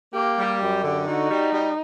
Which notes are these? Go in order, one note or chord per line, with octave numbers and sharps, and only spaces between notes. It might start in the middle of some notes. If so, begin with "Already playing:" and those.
A#3 G4
G3
F#2 G4
D3
D#4 F#4
G3
G3